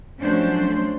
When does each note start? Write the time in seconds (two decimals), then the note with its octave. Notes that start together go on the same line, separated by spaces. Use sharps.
0.20 F3 F#3 A3 C#4 D4 C5